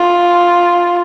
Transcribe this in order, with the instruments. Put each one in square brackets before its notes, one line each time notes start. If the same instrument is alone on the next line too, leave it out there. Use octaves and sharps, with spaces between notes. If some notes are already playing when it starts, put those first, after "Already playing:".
Already playing: [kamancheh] F4